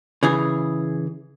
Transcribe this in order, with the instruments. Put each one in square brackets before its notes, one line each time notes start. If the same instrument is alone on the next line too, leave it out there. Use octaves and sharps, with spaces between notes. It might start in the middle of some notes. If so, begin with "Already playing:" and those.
[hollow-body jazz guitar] C#3 E3 G#4